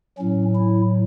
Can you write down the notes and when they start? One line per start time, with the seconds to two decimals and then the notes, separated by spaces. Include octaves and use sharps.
0.18 A2 F#3 C#4
0.56 E4